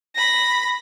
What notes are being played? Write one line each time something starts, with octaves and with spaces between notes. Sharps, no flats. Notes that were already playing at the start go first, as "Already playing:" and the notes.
B5 A#6